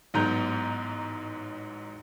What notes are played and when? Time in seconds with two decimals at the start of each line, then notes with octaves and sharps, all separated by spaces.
0.14 A1 G#2 F#3 B3 A#5 G6